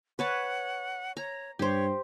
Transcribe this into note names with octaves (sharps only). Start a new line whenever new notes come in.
B4 C#5 F#5 A5
C#5 A#5
G2 G4 C5 C#5